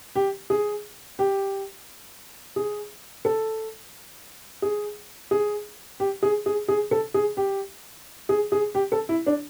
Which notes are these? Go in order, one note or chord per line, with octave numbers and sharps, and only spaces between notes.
G4
G#4
G4
G#4
A4
G#4
G#4
G4
G#4
G#4
G#4
A4
G#4
G4
G#4
G#4
G4
A4
E4
D4